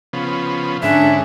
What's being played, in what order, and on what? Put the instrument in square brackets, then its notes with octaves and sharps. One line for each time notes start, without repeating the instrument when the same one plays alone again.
[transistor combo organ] C#3 F3 B3
[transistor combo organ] G#2 D3 [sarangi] C#4 [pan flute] D4 [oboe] E5